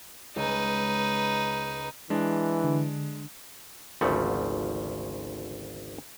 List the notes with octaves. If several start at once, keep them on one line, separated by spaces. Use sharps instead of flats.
C#2 D#4 B4
E3 G#3 D4
D3
G#1 D2 C#3 F3 A3 F#5